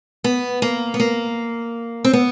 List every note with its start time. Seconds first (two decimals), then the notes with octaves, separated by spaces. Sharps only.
0.24 B3
0.62 A#3
0.94 B3
1.00 A#3
2.04 C4
2.13 B3